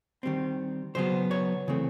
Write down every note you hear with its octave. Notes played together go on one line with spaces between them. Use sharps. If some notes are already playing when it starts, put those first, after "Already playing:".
D#3 G3 C4
C#3 F#3 B3 C5
C#5
C#3 E3 A3 C4